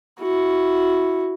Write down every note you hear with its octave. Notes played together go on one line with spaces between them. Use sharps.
E4 F#4